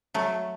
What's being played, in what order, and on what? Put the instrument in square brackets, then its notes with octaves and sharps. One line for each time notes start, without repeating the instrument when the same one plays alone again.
[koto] F#3 A3